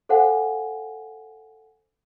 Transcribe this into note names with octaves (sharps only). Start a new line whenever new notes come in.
A4 C5 F5 F#5 G#5